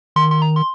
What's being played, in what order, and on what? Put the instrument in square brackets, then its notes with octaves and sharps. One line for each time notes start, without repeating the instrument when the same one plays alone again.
[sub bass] D#3 [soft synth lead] C6
[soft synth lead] C6
A#5
C6